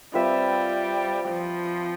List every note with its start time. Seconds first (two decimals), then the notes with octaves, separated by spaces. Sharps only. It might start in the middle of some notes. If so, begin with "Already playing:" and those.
0.14 G3 C4 F4 B4 E5
1.30 F3